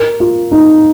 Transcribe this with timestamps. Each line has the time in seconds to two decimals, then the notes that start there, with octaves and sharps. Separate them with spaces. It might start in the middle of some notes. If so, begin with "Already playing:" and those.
Already playing: A#4
0.20 F4
0.52 D#4